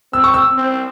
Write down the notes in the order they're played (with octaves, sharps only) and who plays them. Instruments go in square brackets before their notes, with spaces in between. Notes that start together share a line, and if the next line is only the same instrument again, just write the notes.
[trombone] C4 [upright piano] E6
[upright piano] C#6
E6
[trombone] C4